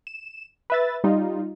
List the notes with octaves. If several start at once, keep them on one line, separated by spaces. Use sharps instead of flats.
E7
B4 E5 A6
G3 D#4 F4